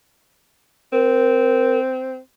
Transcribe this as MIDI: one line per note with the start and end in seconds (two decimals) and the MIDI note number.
0.93 2.18 60
0.93 1.79 70